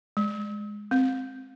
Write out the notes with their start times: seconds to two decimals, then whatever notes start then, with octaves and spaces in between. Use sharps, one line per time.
0.17 G#3
0.91 C4